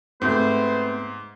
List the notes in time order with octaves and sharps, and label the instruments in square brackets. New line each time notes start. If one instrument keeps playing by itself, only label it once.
[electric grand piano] G#2 [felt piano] A3 C4 [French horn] B3 [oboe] C5